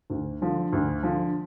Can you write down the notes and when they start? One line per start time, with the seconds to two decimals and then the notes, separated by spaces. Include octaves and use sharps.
0.10 D2
0.41 D3 F3
0.73 D2
1.03 D3 F3